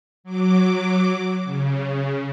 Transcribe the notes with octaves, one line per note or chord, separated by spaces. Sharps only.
F#3 D6
C#3